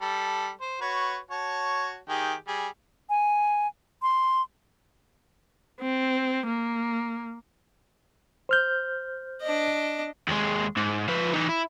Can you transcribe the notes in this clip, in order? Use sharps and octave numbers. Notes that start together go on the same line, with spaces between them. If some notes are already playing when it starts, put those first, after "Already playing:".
G3 A4
C5
F#4 B4 C#5
F#4 C#5 A5
D#3 G4 G#4
G3 G#4
G#5
C6
C4
A#3
C5 F6 G6
D4 D#5
D#2 G#3
G#2
F3 B4
E3 D#4
E4